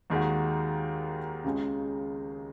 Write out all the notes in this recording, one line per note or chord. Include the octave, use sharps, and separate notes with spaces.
D#2 D#3 G#3 F#4
C#2 C#3 G#3